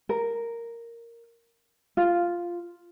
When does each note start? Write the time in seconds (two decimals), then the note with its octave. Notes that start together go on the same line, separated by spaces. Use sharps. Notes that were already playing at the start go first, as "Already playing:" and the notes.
0.09 A#4
1.97 F4